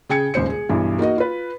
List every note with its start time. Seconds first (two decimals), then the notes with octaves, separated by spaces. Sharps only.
0.09 C#3 G#4 G5 G#6 C#7
0.34 D#1 C#2 G#2 C5 C#7
0.50 G#4
0.69 B1 G2 E3
0.99 A#3 D#4 F#4 D#5
1.18 F4 B4